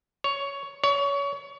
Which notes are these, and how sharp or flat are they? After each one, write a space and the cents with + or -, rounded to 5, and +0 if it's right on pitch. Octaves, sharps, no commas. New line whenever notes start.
C#5 +10
C#5 +25